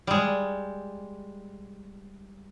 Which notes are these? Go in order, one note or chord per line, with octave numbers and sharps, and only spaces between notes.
G3 G#3